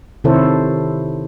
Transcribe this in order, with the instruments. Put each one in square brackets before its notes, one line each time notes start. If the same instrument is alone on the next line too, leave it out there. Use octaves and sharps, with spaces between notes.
[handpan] C3 D#3 E4 A4 C5 C#5